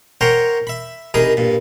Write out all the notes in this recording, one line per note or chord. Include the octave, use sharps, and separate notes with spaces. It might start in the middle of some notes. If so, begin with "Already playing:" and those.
A#4 C5 C#5 F#5 G5 A#5
E5 B5
C2 D#4 G#4 A#4 B5 D#6
G2 A#2